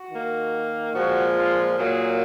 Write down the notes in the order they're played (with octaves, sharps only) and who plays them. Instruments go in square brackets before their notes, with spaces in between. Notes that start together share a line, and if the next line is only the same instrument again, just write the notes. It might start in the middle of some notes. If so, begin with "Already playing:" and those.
Already playing: [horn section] F#4
D#3 A#3
A#2 F3 G#3 F#4
F4
A#2 F#3 A#3 G#4